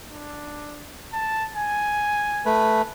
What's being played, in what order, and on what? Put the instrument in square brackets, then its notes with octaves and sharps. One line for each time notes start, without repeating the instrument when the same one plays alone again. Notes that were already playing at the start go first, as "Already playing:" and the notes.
[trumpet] D4
A5
G#5
[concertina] A3 B4